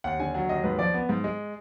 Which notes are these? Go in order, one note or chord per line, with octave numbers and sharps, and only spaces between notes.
D#2 F#5
D3 G#5
F#3 F#5
D#2 D#5
G#2 B4
F3 D5
B3
G#2
G#3